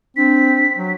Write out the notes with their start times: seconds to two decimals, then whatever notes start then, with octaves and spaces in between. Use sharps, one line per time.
0.17 C4 D4 B6
0.78 F#3